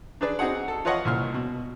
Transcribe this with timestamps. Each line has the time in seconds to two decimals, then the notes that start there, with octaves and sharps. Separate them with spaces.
0.21 D4 G#4 B4 D5
0.39 C4 D#4 F#4 G#4 F#5
0.68 A4
0.85 F4 B4 C#5 D#5 F#5 C#6
1.05 C2 A#2 F6
1.34 B2